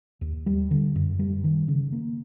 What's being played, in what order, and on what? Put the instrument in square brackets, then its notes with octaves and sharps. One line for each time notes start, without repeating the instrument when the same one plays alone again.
[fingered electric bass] D#2
G3
D3
F#2
G3
D#3
C#3
A#3